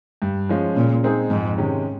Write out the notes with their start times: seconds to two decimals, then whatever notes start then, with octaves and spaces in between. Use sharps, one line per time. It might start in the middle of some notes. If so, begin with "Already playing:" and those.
0.22 G2
0.49 F3 G#3 C#4 F4
0.76 A#2 C#3
1.03 G#3 C4 D#4 G#4
1.31 F2 G#2
1.58 C3 D#3 G#3 C#4